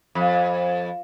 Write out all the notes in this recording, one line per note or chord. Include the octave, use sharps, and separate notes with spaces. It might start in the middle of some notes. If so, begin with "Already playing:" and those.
F2